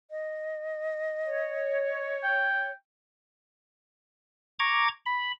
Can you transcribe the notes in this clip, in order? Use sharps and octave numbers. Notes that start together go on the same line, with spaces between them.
D#5
C#5
G5
A#5 C#6 D6 G#6
B5